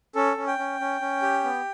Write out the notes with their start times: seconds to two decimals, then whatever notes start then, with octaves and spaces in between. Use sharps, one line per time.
0.15 C#4 A4
0.37 C#4
0.47 G5
0.58 C#4
0.80 C#4
1.01 C#4
1.22 G4
1.44 B3